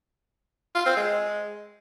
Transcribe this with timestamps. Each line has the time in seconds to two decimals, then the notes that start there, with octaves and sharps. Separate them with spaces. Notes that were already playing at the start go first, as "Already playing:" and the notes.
0.75 F4
0.86 C4
0.97 G#3